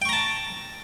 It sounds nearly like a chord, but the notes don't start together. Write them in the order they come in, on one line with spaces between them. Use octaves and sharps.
G5 C#6 A#5 A5